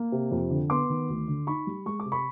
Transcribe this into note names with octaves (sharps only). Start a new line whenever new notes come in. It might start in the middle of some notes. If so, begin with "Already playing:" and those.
Already playing: A#3
C3
F2
D3
B3 C6 D6
D#3
D2
D3
D#4 B5 C#6
G3
G#3 C#6
D6
C3
B5 C#6